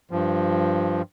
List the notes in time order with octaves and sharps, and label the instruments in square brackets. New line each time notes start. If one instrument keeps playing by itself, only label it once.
[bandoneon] G2 F3